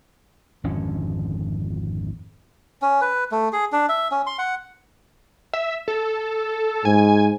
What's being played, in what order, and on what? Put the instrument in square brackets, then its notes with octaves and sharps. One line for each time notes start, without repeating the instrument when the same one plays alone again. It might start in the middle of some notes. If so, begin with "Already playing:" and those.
[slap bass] G#1 F2 D3 C#4
[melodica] C#4
B4
A3
G#4
D4
E5
C#4
C6
F#5
[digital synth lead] E5
A4
[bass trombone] G#2 [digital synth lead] G#5